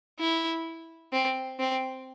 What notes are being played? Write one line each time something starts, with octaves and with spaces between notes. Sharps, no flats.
E4
C4
C4